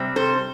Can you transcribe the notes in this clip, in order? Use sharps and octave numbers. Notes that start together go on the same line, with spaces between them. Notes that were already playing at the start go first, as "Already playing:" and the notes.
Already playing: C3 G3 C4
A4 C5